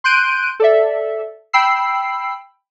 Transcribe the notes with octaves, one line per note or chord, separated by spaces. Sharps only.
C6 F#6 G6 D7 D#7
A4 D5 E5
G5 B5 E6 C7